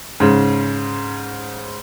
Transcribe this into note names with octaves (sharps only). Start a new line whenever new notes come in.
G#2 C#3